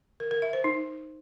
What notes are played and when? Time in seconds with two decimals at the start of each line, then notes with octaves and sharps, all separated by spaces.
0.20 A#4
0.31 A#4
0.42 E5
0.53 C5
0.64 D#4